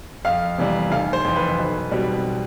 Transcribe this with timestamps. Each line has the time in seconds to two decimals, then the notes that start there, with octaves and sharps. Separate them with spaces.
0.25 F2 F5
0.58 C3 E3 G3
0.91 F1 F5
1.13 C5
1.24 F2 E3
1.36 B4
1.58 B1
1.91 B2 G3 C4